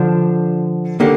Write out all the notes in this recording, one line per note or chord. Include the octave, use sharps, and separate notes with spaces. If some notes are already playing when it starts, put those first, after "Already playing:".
Already playing: D3 F3 D4
D3 A#3 G4